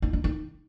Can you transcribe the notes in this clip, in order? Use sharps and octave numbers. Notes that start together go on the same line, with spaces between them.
D#4
D4
D#4